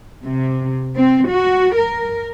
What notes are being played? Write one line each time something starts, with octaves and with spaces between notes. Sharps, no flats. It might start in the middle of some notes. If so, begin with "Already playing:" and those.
C3
C4
F#4
A#4